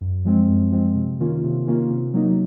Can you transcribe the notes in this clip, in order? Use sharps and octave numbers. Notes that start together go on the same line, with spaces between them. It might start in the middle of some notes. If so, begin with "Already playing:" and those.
F#2
F3 G#3 C4
F#2
F3 G#3 C4
C3
D#3 A#3 C#4 F4
C3
D#3 A#3 C#4 F4
C3
F#3 A#3 D#4